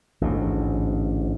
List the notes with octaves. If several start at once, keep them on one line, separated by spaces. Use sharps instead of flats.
A1 D2 G#2